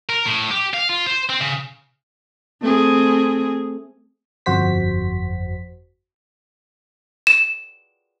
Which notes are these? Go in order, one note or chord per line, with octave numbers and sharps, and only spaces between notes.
A#4
A2
G4
F5
F4
C5
C4
C#3
A3 C4 G#4
G1 F2 F#4 C5 B6
E7